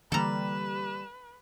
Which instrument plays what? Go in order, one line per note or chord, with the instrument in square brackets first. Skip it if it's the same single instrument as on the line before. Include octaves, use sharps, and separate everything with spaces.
[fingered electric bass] D3 E3 A#3 [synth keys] G3 E7 [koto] A4 A#5 [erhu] B4